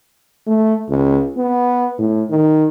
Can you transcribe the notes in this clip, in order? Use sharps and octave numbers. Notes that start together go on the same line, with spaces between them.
A3
C#2
B3
A2
D#3